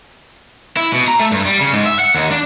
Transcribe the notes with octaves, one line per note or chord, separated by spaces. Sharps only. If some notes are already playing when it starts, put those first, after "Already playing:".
E4
B2
A#5
A3
G2
G3
C#3
G#2
E5
F#5
D#2
D4